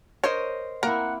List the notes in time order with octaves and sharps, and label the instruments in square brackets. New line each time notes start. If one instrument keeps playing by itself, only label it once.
[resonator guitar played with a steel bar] A#4 C5 D#5 [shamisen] C#5
[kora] A#3 C4 E4 [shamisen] A#4 [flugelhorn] F#5